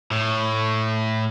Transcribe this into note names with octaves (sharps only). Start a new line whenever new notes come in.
A2